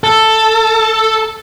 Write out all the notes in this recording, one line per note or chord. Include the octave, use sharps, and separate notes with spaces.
A4